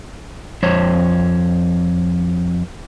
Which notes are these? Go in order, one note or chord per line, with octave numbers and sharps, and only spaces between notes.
F2 C5 C#5